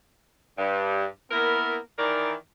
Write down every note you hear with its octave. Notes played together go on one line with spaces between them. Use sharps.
G2
A#3 B3 E4 A#4
D#3 E3 D#4 A#4 D5